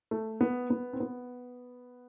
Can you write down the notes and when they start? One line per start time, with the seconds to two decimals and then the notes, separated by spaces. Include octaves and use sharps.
0.11 A3
0.41 B3
0.70 B3
0.93 C4
1.00 B3